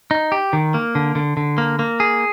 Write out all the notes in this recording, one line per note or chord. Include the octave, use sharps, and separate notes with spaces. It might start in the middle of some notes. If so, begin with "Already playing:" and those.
D#4
G4
D#3
A#3
D3
D3
D3
A#3
A#3
G#4